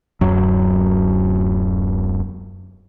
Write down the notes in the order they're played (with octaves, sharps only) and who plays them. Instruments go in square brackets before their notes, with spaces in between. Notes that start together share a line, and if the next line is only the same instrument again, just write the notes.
[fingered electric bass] D1 F#2 F#3